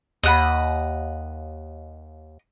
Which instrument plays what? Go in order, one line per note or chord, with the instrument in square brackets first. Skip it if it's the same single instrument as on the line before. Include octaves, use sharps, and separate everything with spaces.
[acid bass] D#2 [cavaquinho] D#5 F#5 B5